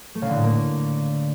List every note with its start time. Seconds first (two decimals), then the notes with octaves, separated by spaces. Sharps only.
0.15 A3
0.22 C#3
0.29 D3
0.36 A2
0.43 A#3